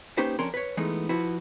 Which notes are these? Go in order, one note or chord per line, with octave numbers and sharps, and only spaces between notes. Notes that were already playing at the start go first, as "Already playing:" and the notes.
A#3 C#4 D#4 G4 B4 C5
F2 C#4 D4 A#4 C6
B4 C#5
E3 G#3 A3 B3 D#4
F3 E4 F#4 B4